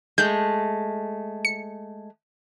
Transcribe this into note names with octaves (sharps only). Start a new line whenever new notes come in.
G#3 A3 G6
C#7